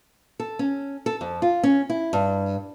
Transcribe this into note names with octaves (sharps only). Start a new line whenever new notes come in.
A4
C#4
A4
F2
F4
C#4
E4
G2